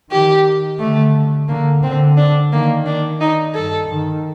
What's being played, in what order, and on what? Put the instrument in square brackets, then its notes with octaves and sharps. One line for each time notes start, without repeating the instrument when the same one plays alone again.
[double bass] D#3 [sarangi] G4
[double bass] D3 [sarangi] A3
[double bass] D3 [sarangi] A#3
[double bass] D3 [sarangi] C4
[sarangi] D4
[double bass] D#3 [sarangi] A#3
[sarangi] D4
D#4
[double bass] G2 [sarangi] A4
[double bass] D#3